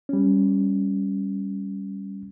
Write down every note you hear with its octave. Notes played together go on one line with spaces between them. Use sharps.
G3 C#4